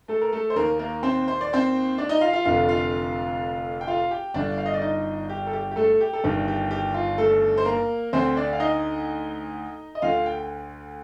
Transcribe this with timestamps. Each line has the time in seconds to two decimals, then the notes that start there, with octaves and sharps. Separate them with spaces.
0.08 A3 A4
0.21 A#4
0.33 A3 A4
0.50 C5
0.56 D#2 D#3 A#3 A#4
0.79 A#3 A#4
1.03 C4 C5
1.28 C5
1.41 D5
1.53 C4 C5
1.98 D4 D5
2.09 D#4 D#5
2.21 F4 F5
2.33 F4 F5
2.45 F1 F2 D3 F4 F5
2.68 F4 F5
3.81 G5
3.87 F4 F5
4.11 G4 G5
4.34 G1 G2 D3 D4 D5
4.58 F5
4.66 D#5
4.74 D5
4.81 D#4 D#5
5.29 G4
5.47 A4
5.53 G4
5.71 G4
5.76 A3 A4
6.00 G4
6.13 A4
6.24 G1 G2 D#3 G4
6.48 G4
6.71 G4
6.94 F4
7.18 A3 A4
7.57 C5
7.65 A#3 A#4
8.13 D2 D3 C4 C5
8.36 D4 D5
8.53 F5
8.60 D#4 D#5
9.95 D#5
10.02 D2 D3 F4 F5
10.26 G5